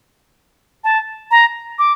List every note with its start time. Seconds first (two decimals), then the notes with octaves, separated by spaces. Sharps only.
0.84 A5
1.31 A#5
1.79 D6